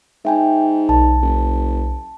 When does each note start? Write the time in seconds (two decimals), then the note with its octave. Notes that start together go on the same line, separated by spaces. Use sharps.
0.25 G#2 E5 G5 G#5
0.89 B1 A5
1.21 F#1